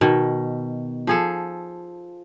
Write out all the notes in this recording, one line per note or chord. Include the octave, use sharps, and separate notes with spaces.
B2 D#3
F3 G#4 A4